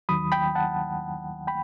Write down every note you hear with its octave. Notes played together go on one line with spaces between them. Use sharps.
D#2 D#3 F#3 B5 D#6
G5 B5
F#5 A5
G5 B5